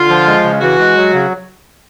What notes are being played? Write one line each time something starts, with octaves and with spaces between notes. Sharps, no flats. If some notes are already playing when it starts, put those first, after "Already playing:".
Already playing: D3 F4
F3
G#3
C#3
E3 F#4
G#3
F#3
C#3